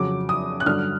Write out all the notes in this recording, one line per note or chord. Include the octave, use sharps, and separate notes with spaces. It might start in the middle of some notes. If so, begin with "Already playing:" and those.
Already playing: F2 C#3 F#3 D6
D#6
F#6
G2 D3 F#3 F6